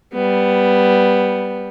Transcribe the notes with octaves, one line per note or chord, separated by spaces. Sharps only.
G3 B3